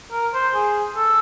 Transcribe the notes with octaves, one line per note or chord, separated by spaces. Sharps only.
A#4
C5
G#4
A4